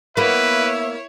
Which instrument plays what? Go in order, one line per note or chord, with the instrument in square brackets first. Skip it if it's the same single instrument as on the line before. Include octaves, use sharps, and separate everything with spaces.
[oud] A#3 B3 [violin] E4 C#5 [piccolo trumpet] B4 [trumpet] E5